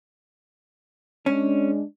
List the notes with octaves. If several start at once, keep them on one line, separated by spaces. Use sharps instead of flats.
G#3 C#4 D4